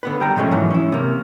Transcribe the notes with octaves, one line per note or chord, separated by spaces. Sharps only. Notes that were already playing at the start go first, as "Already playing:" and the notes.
D3 B3 B4
G3 G5 A#5
A#2 F3 G#3 A3 C#4
G#2 E3 F#3
C#4 E4
C3 A#3